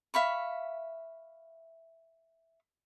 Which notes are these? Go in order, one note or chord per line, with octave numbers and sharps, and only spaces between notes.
E5 F5 B5 C#6